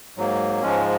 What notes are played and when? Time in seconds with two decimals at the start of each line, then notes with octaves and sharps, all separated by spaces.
0.17 G#2 F#3 A#3
0.62 G#2 F3 G#3 C#4